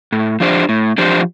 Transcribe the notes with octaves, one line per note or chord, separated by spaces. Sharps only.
A2
F3 D4 G4 C5
A2
F3 D4 G4 C5